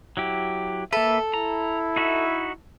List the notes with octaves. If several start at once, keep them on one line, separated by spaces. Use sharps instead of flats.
F#3 E4 G4
A#3 A4 B4 E5
E4 A#5
D#4 F#4 E5